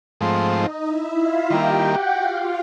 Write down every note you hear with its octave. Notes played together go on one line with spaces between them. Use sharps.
G#2 F3 A3 C4
D#4 D#5
E4 E5
F4 F5
D#3 G3 A#3 G4 G5
F#4 F#5
F4 F5